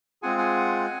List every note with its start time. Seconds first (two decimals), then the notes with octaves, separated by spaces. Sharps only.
0.22 G#3 C4 F4 G#4 F#5 G#5
0.38 F#5 G#5